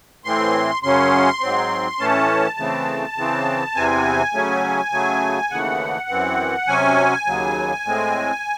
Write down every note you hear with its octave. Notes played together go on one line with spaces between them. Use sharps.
A2 E3 C4 C6
F#2 C#3 F#3 C#4 C6
G#2 F#3 C4
A2 E3 A3 C#4 A5
C#3 E3 A3 C4
C#3 E3 C4
E2 C3 E3 C4 G#5
C#3 F#3 A3 C#4
C#3 F#3 A3
D#2 C#3 E3 A3 F#5
F#2 E3 C4
C3 F#3 C#4 G#5
D#2 C#3 F#3
A2 G#3 C4